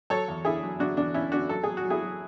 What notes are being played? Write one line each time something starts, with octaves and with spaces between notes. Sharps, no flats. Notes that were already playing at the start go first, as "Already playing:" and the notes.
F#3 A4 C#5
E2
D3 E4 G#4
F#3
F#3 D4 F#4
E2 D4
D3 C#4 E4
D3 D4 F#4
F#3 A4
F#3 G#4
F#4
F#3
E4 G#4
F#3